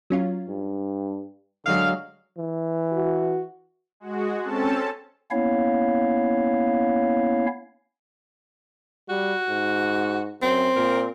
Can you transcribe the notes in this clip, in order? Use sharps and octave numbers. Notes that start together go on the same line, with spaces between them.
F#3 C#4 F4
G2
D3 F#3 G#3 F5
E3
F#4
G#3 F#4
C4 C#4 A4 A5
A#3 B3 C#4 E4 C#5 F5
G3 F#4
G#2
F#2 C4
A#2 A#4